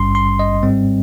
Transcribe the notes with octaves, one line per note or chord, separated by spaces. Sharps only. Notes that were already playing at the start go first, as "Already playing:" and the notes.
Already playing: G#1 G2 G3 C#4 C6
C6
D#5
G#2 G3 C4